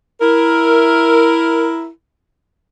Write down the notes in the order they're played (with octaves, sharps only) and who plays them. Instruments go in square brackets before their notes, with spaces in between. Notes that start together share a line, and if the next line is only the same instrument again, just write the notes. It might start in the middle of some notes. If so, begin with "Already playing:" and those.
[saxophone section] E4 A#4